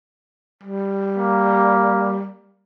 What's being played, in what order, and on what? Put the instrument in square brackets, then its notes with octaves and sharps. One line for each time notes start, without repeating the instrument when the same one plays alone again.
[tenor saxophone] G3
[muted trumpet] A#3